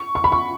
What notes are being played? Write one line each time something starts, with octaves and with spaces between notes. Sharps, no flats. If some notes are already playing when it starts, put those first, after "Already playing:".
Already playing: C#6
C#6
B5
C#6